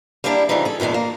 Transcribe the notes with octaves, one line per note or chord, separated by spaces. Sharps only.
G3 A#3 B3 D4 E4 G4
C#3 E3 F3 G3 D#4
G#4 A4
E2 A#2 D#3 G#3 D4
A#3